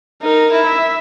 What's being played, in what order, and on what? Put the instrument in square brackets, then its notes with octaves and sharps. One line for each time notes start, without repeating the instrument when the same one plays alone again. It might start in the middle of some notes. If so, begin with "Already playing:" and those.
[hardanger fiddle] D#4 [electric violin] A#4
[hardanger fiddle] E4
[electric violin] E5